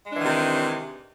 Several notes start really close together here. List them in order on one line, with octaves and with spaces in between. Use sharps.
G#3 D4 E3 D#3 C3